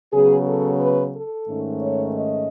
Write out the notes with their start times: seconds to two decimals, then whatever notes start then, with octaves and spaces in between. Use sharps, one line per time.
0.13 C#3 F#3 B3 G#4
0.48 A4
0.81 B4
1.14 A4
1.48 G#2 D#3 A3 C#4
1.81 C#5
2.15 D#5